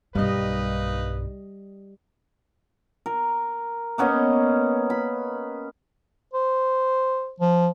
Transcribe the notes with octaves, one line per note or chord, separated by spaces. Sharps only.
B1 G2 G3 A#3 D#4 B4 D#5
A#4
A#3 B3 C#4 D#5
B5
C5
F3